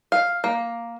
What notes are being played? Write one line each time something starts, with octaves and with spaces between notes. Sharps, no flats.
F5
A#3